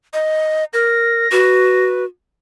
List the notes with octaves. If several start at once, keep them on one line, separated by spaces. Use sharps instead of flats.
D#5
A#4 A#6
F#4 B4